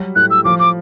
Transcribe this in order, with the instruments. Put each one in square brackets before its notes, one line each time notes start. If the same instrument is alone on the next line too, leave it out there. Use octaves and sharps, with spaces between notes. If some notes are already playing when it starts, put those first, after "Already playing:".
Already playing: [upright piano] F#3 G3
[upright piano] A2 [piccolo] F#6
[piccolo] E6
[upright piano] F3 [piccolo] D6
[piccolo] D6